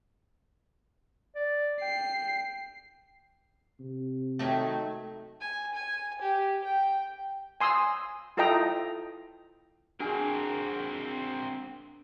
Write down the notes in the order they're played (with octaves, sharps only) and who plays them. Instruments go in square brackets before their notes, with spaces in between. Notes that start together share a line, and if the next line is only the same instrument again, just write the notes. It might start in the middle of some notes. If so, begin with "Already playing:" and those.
[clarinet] D5
[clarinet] G5 [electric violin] C7
[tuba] C3
[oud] D#3 F#3 A3
[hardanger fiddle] G#5
G#5
G4
G5
[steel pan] G#5 C6 D#6 E6
E4 F4 A4 D#5 G5 A#5
[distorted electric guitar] C4 A#4 [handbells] D4 [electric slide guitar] F#4 G#4 G#5